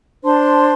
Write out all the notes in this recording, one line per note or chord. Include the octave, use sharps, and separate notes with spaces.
D4 C5 A5 C6